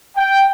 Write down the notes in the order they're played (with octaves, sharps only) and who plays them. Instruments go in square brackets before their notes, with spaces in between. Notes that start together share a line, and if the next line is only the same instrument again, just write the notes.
[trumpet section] G5